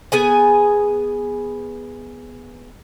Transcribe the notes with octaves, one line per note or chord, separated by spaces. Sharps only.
B3 G#4 G#5